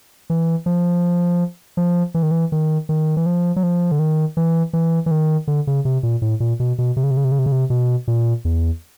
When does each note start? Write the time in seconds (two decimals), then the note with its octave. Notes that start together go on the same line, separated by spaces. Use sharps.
0.30 E3
0.66 F3
1.77 F3
2.14 E3
2.23 D#3
2.31 E3
2.52 D#3
2.89 D#3
3.17 E3
3.26 F3
3.56 F#3
3.63 F3
3.92 D3
3.99 D#3
4.37 E3
4.73 E3
5.06 E3
5.11 D#3
5.48 D3
5.67 C#3
5.85 C3
6.03 A#2
6.22 A2
6.40 A#2
6.60 B2
6.78 B2
6.97 C3
7.03 C#3
7.11 C3
7.17 C#3
7.24 C3
7.32 C#3
7.39 C3
7.46 C#3
7.52 C3
7.70 B2
8.08 A#2
8.45 E2